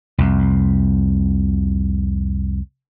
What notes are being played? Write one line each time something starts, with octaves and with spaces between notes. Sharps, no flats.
C2 F2